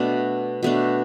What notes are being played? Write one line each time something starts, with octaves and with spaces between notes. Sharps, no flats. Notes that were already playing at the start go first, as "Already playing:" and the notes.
Already playing: B2 A3 D4
B2 A3 D4